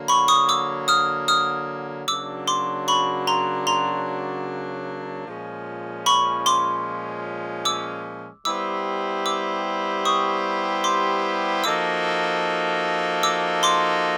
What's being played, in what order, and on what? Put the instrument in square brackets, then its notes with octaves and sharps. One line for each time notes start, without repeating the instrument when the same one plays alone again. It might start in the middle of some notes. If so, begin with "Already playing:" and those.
Already playing: [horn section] D3 F#3 A#3
[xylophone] B5 C#6
C#6 D#6
D6 E6
D#6 F6
D#6 F6
[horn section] C#3 F#3 A#3 D4 F#4 [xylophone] D6 E6
[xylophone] C6 D6
B5 C#6
A#5 C6
A#5 C6
[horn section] A#2 F3 G#3 C#4
[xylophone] B5 C#6
C6 D6
D6 E6
[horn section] G3 B3 E4 G4 C5 [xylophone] D6 E6
[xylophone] D6 E6
C#6 D#6
C6 D6
[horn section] F3 A#3 D#4 F#4 A4 [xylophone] D6 E6
[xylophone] D6 E6
C6 D6